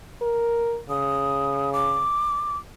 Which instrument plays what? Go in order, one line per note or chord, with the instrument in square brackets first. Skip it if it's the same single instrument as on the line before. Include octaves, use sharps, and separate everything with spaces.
[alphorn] A#4
[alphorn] C#3 [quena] D#6
[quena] D6